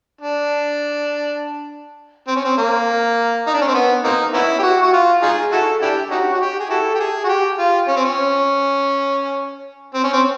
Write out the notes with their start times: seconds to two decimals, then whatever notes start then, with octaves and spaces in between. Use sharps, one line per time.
0.21 D4
2.28 C4
2.36 C#4
2.45 C4
2.58 A#3
3.47 D#4
3.54 D4
3.61 C#4
3.68 C4
3.74 B3
4.04 A#3 C4 D#4
4.34 B3 C#4 E4
4.59 G4
4.63 F#4
4.83 F#4
4.93 F4
5.23 D#4 F4 G#4
5.52 E4 F#4 A4
5.82 D4 E4 G4
6.11 C#4 D#4 F#4
6.34 F#4
6.41 G4
6.59 G#4
6.70 E4 F#4 A4
6.95 G4
7.00 G#4
7.24 F#4
7.28 G4
7.59 F4
7.88 C#4
7.96 C4
8.04 C#4
9.94 C4
10.04 C#4
10.13 C4